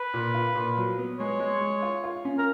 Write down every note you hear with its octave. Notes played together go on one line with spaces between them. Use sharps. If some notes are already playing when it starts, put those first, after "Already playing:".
Already playing: B4
A#2
F4
A#2
F#3
B3
G#3 C#5
G#3
G#3
F4
F4
C#4
A#4